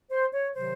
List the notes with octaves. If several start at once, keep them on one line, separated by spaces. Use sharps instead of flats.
C5
C#5
C3 D#3 F#3 C5